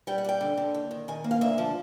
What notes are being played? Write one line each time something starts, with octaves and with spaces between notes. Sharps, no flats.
G3 G5
F#5
G3 G5
D3
D3
D#2
D#3
D#3 G#5
A#3
F5
D2 E5
F3